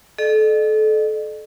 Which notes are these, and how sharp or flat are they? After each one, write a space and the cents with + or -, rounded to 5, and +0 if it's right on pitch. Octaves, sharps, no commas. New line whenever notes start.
A4 -30 D#5 -45